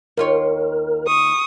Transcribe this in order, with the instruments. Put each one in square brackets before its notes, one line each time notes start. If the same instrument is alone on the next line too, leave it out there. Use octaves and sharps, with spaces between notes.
[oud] D#2 F4 C#5 [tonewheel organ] A#4
[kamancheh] C#6 D#6